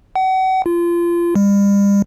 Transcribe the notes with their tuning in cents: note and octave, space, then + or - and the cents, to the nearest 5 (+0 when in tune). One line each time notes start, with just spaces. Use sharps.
F#5 +35
F4 -25
G3 +40